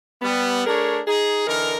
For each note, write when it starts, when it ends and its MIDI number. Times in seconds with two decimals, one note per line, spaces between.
0.22 0.62 55
0.22 0.62 59
0.67 1.00 57
0.67 1.00 62
0.67 1.00 68
0.67 1.00 70
0.67 1.00 73
1.07 1.47 63
1.07 1.47 68
1.48 1.77 50
1.48 1.77 52
1.48 1.77 63
1.48 1.77 70